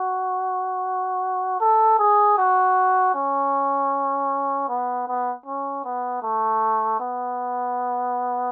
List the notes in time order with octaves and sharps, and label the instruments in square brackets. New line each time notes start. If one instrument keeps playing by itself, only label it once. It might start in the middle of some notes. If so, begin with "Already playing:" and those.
Already playing: [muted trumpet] F#4
A4
G#4
F#4
C#4
B3
B3
C#4
B3
A3
B3